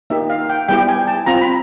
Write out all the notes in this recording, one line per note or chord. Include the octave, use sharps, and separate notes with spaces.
A#3 D#4 G4 E5
F5
G5
G3 B3 E4 G4 G5
G#5
A5
C4 F4 A#5
B5